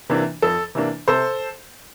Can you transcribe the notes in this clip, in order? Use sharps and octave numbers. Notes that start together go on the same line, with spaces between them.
C3 E3 A#3 D4
F2 A4
C3 E3 A#3 D4
C3 A4 C5